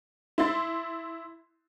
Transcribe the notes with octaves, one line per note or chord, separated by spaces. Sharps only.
E4 C6 A6